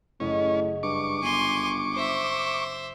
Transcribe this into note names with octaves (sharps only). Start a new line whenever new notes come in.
F#1 A2 C#4 D#5
G2 C#6 D6
G1 G#5 C6
C5 E5